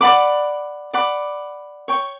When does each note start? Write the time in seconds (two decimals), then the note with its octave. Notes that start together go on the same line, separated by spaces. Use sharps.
0.01 D5 F#5 B5 D6
0.93 D5 F#5 B5 D6
1.88 C#5 G5 C#6